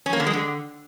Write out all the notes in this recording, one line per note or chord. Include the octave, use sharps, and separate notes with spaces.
C#4
A#3
D3
G#3
D3